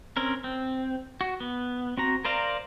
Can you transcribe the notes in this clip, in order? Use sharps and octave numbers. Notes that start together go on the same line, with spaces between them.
C4 C#4 A#4
C4
F#4
B3
C4 F#4 A#5
A#4 C5 D5 F5 A#5